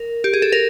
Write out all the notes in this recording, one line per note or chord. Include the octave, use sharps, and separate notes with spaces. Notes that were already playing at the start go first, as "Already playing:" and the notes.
Already playing: A#4
G4
G#4
A4
A#4